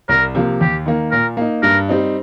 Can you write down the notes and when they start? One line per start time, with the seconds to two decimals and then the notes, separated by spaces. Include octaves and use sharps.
0.09 C2 A#4
0.35 C3 F3 A#3
0.61 D#2 G4
0.86 D#3 A#3
1.11 A#2 A#4
1.37 A#3 D#4
1.63 G2 A#4
1.89 G3 C4 D#4